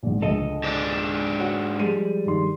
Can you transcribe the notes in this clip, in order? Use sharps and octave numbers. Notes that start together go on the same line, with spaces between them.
A#1 G#2
C#2 D3 A4 D#5
G#2 D4
F#4 C#5
F3 G3 G#3 G#4 D#7
G2 D#3 C6